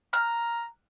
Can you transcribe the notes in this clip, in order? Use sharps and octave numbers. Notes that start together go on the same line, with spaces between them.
A#5 F6